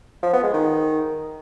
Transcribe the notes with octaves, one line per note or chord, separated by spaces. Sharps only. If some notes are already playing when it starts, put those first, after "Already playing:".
F3
B3
G#3
D#3